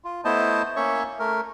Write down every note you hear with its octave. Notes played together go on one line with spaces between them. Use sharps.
F4
A3 B3 E4 C5 D#5 A5
A#3 C#4 C#5 E5 C#6
A3 A#4